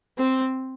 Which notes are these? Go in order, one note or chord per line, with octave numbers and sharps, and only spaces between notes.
C4